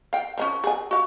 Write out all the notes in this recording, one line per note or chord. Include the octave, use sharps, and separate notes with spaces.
F5 G5
F3 B3 C#4
G#4 G#5
F#4 F5